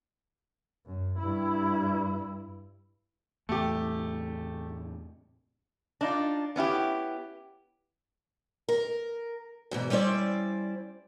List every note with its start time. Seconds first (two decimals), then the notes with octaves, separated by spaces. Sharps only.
0.87 F#2
1.19 G2 E4
3.49 E2 A2 C3 A3 G4
6.01 D4 D#4 F4
6.56 B3 C#4 E4 G4
8.69 A#4
9.71 E2 G#2 B2
9.90 G3 C#4 E4 C5 D5